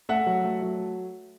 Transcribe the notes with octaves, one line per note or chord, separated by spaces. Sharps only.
A3 E5 F#5
F#3
A3
F#3